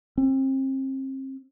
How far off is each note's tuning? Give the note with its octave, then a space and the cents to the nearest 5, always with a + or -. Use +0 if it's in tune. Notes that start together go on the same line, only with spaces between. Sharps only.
C4 +35